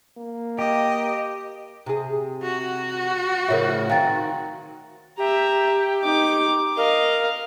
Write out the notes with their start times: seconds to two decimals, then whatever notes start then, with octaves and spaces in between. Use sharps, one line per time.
0.17 A#3
0.59 G4 D#5
1.86 C3 G#4
2.43 F#4
3.48 A2 C#3 F3 A#4 C#5 E5
3.90 D#3 F#3 C4 F5 G5 A6
5.18 G4 E5 A#5
6.02 D#4 D6
6.77 A#4 D#5 F5